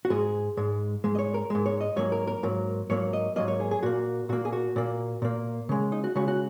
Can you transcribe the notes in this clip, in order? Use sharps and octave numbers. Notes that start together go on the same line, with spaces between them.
F#4
G#2 G#3 G#4
G#2 G#3
G#2 G#3
D#5
C#5
A#4
G#2 G#3
C#5
D#5
G#2 F#3 A#3 C#5
A#4
A#4
G#2 F#3 A#3
G#2 F#3 A#3 C#5
D#5
G#2 F#3 A#3 D#5
C#5
G#4
G#4
A#2 A#3 F#4
A#2 A#3 F#4
G#4
F#4
A#2 A#3
A#2 A#3
C#3 G#3
D#4
F#4
C#3 G#3 F#4
F#4